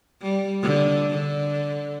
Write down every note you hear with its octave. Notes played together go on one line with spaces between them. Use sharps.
G3
D3
D3